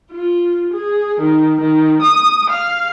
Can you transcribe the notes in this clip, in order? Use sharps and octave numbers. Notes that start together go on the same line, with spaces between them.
F4
G#4
D#3
D#3
D#6
F5